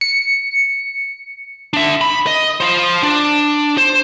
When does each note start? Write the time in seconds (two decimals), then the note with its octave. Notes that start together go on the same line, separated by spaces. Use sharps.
0.01 C#7
1.73 D4 E5
2.01 B5
2.27 D#5
2.60 F4 C5
3.03 D4
3.78 C5